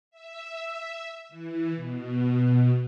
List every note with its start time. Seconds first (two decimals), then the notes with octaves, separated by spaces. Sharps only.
0.11 E5
1.29 E3
1.76 B2